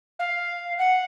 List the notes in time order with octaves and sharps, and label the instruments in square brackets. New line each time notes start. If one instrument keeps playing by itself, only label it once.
[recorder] F5
F#5